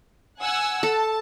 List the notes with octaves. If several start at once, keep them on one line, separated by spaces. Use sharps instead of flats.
F#5 G#5 E6
A4 A5